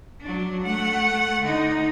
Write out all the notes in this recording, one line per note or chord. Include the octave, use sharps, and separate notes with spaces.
F#3 D4
A3 F#5
D3 D#4